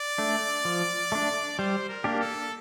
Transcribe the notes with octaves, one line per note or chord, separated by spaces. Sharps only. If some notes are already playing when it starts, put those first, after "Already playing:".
Already playing: D5
A3 D4
F3
A3 D4
G3 C5
A#4
A#3 D4 G4
A4